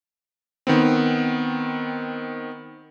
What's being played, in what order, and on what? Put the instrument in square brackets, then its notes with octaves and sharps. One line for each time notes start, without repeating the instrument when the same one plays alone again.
[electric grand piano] D#3 B3 C4